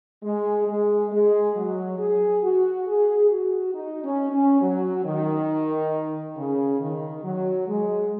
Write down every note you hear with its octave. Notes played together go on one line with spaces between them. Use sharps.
G#3
G#3
G#3
F#3
G#4
F#4
G#4
F#4
D#4
C#4
C#4
F#3
D#3
C#3
D#3
F#3
G#3